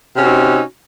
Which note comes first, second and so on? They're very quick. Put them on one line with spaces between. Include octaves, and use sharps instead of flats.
C3 C#4 F#4 D#4 C4